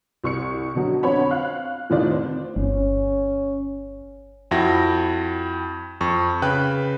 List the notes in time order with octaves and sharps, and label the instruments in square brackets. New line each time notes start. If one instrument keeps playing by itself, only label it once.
[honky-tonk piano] C2 C#6 C#7
B2 D3 F#3
F2 C4 D4 C#5 F#5 B5
F5 F#6
F1 A2 D#3 F4 D5
C4
[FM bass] G1 [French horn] C#4
[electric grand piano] F2 E4 F#4 G5 A#6
F2 C#6
C#3 B4 G5 B5 F#6